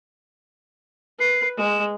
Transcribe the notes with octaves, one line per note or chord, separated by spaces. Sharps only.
B4 C7
G#3 E7